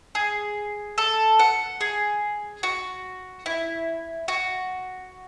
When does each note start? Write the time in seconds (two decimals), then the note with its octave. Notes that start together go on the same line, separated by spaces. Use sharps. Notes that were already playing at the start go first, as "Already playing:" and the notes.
0.15 G#4
0.98 A4
1.39 F#5
1.81 G#4
2.63 F#4
3.46 E4
4.28 F#4